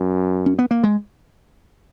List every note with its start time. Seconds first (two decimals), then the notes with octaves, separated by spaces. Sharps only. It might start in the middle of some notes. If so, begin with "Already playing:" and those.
Already playing: F#2
0.46 C#4
0.59 B3
0.71 A#3
0.84 G#3